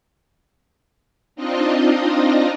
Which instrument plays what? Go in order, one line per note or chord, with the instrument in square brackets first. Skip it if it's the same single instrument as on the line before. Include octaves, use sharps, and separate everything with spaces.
[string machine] C4 D4 D#4 F4 D#5